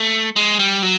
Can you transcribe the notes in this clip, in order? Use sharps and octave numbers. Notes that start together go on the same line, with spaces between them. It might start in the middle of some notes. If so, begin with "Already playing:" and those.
Already playing: A3
G#3
G3
F#3